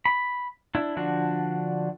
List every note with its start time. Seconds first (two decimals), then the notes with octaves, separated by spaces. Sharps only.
0.05 B5
0.75 D4 E4
0.96 D3 F3 D4 F#4